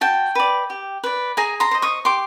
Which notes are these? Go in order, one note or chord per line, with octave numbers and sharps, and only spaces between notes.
F#4 G5 A5
B4 D5
G4
B4 D5
G#4 G#5 A#5
A#5 C6
C5 D#5
C#6 D#6
G4 C6 D6